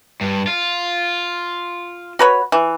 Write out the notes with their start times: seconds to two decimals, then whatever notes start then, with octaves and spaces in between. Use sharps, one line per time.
0.21 G2
0.47 F4
2.19 F#4 B4 C#5
2.52 E3